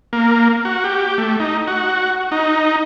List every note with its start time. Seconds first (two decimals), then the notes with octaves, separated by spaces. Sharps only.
0.13 A#3
0.65 F#4
0.84 G4
1.18 A3
1.40 D#4
1.67 F#4
2.32 D#4